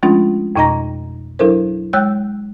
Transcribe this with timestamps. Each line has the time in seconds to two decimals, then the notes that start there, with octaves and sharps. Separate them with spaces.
0.03 F3 G#3 A3 C#4 D4 F4
0.56 F2 B2 D#4 D#5 A#5 A#6
1.39 F#3 D4 E4 A4 A#4 C5
1.93 G#3 C#5 G5 E6 F#6 G6